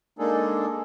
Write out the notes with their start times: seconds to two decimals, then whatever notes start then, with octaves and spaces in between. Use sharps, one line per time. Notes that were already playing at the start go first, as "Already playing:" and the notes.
0.19 G#3 A#3 D4 D#4 G#4 A4